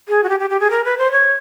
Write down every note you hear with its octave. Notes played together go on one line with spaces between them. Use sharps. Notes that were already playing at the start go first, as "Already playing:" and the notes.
G#4
F#4
G4
G4
G4
G#4
A#4
B4
C5
C#5